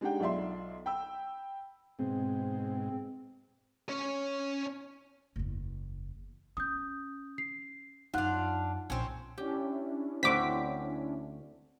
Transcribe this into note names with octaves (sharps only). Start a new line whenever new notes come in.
G#3 D4 D#4 G4 F#5 G5
B1 F4 D5 E5 C6
G5 B5 E6
G#2 B2 G#3 C4
C#4 C#5
F#1 E2
C#4 D#6 G6
C7
F#2 D4 D#4 F4 F#5 F#6
A#1 C4 C#4
C#4 D4 E4 G4
D2 D3 C4 F#4 C5 D6 B6